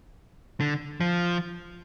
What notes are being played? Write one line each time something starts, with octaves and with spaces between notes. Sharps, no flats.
D3
F3